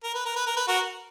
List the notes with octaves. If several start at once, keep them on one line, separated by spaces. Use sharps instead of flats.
A#4
B4
A#4
B4
A#4
B4
F#4 A#4